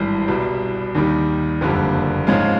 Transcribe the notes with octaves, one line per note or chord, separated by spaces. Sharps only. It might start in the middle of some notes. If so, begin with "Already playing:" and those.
Already playing: G#1 G2 E3
C2 B2 G3
D#2 D#3 G3
F#1 F2 D3 G3 A#3
G#2 F3 G#3 C#4 F4